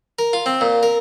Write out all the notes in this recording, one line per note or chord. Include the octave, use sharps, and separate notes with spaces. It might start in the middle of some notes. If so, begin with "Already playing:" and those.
A#4
F4
C4
A#2
A#4